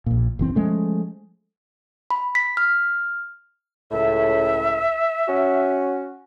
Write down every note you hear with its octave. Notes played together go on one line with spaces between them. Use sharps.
A#1 A#2
F#1 E3 C4
F3 G#3 A3 C#4
B5
B6
F6
C#2 A2 E5
C#4 F#4